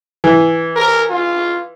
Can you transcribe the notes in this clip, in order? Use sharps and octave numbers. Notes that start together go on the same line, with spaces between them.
E3
A#4
F4